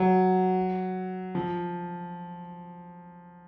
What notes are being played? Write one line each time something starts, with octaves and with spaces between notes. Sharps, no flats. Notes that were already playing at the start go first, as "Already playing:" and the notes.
Already playing: F#3
F3